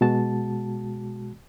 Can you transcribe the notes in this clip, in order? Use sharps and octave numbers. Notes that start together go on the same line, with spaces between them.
B2 G#3 F#4 A5